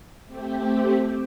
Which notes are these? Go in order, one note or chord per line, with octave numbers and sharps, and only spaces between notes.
A3 C4 G4